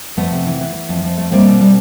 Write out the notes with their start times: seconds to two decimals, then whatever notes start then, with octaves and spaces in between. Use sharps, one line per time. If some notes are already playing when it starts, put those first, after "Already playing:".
0.17 F2 A3 B3
0.32 C3
0.46 E3
0.61 E3
0.74 E3
0.89 F2
1.04 F2
1.17 A3
1.32 G3 A#3 C4
1.46 B2
1.61 G3